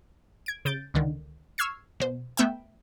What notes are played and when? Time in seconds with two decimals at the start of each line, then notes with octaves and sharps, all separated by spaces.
0.46 G#6 D7
0.65 C#3 G6 A6 D7
0.94 C#2 D3 D#3
1.58 C#6 E6 F6 G#6 C7
2.00 B2 C5
2.37 A3 B3 E5 G5